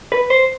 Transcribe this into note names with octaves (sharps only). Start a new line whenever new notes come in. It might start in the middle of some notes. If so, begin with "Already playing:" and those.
B4
C5